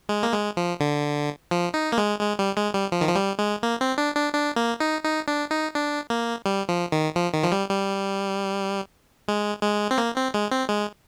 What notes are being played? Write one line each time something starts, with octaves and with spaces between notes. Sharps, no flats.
G#3
A#3
G#3
F3
D3
F3
D#4
A#3
G#3
G#3
G3
G#3
G3
F3
D#3
F3
G3
G#3
A#3
C4
D4
D4
D4
A#3
D#4
D#4
D4
D#4
D4
A#3
G3
F3
D#3
F3
D#3
F3
G3
G3
G#3
G#3
C4
A#3
C4
G#3
C4
G#3